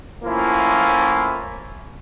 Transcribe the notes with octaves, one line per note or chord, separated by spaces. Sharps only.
A2 F3 A#3 C#4 E4 F4